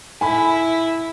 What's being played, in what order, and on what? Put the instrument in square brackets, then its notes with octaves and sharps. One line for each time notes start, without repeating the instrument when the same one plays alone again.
[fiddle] E4 [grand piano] G#5 B5